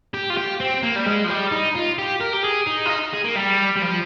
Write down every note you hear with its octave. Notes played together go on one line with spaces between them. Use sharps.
G4
F4
G4
C4
A#3
G3
G#3
F3
G3
D#4
F4
G4
A#4
G4
G#4
D#4
F4
D#4
G#4
A#3
G3
G3
F3